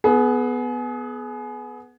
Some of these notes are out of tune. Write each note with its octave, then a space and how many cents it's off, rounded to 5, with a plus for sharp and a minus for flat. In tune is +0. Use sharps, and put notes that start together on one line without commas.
B3 +0 G#4 +30